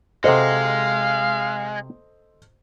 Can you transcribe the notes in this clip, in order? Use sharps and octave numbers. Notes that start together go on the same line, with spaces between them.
C3 G#3 F#4 A4 C5 D#5 F5